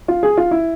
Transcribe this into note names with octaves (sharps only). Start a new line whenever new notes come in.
F4
G#4
F4
E4